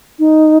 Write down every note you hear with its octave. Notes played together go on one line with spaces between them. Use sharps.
D#4